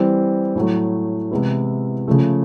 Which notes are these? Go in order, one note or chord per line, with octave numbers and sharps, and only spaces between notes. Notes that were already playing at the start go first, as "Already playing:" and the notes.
Already playing: E3 G3 C4
A2 F#3 A3
C3 E3 G#3 B3 E4
C#3 F3 A3